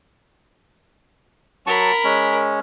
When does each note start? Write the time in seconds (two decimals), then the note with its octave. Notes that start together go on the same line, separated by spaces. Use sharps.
1.67 F#3 A#4 A5 B5 C#6
2.04 G#3 C#4